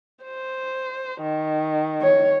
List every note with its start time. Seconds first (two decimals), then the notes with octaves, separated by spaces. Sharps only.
0.25 C5
1.21 D#3
2.02 C#5